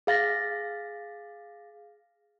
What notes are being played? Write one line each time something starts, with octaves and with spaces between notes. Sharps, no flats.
G#4 F5 A6 A#6